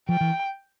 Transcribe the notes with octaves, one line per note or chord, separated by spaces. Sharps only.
F3 G5
E3